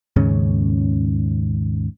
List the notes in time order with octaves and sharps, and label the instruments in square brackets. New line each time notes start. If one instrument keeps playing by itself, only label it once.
[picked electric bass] D#2 G#2 C#3 C#4